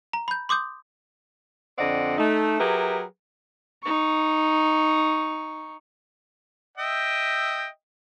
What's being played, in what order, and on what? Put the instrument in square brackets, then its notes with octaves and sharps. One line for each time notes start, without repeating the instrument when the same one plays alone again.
[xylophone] A#5
B5 G6
C6 D6 D#6 G6
[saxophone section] F2 D3 C4 D5 D#5 F#5
A3 D#4
F#3 G4 G#4 A#4 B4 E5
[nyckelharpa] D#4 C#6
[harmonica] D#5 E5 G5